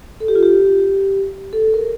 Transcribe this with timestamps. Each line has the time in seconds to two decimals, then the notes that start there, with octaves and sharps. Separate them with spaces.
0.20 A4
0.28 G4
0.35 F4
0.43 G4
1.53 A4
1.74 A#4